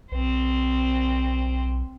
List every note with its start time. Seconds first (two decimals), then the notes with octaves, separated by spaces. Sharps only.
0.12 B1 C4 C5